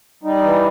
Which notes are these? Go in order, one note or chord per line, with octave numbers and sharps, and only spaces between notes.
G3 D#4
E3